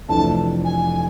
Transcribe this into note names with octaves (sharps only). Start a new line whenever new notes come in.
F1 F2 E3 A3 D4 A5
G#5